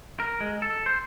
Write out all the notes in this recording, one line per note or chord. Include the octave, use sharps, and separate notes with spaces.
A#4
G#3
A4
C5